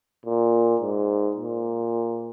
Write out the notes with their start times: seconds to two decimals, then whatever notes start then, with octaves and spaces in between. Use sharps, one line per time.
0.26 A#2
0.81 G#2
1.37 A#2